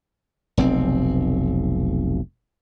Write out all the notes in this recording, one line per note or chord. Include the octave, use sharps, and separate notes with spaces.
F1 B1 C4